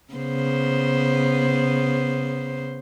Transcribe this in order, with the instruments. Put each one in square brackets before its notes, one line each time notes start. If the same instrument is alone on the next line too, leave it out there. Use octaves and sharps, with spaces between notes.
[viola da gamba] C#3 B3 C5